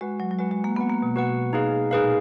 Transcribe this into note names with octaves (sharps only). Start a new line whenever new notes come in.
G#3 F#4 B4 F#5
F#3
F#3
G#3 F#4 B4 F#5
G#3
A#3
B3 F#4 B4 F#5
A#3
B2
F#4 B4 F#5
D#4 G#4 B4 F5
A#2 D#4 G#4 B4 F5